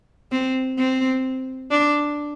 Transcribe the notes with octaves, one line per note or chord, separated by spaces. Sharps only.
C4
C4
D4